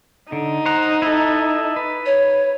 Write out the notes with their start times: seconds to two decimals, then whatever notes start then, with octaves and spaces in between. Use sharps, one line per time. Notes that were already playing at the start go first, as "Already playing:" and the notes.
0.32 D3 D#4
0.66 C5 F#5 A#5
1.02 E4 A4
1.76 B4
2.06 C#5